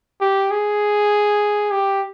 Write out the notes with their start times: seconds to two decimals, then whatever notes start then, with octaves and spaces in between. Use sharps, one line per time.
0.21 G4
0.51 G#4
1.72 G4